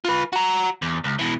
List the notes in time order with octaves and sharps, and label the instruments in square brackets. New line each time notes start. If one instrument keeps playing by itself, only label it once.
[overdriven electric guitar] F4 B4
F#4 A#5
E2
C#2
B2 E3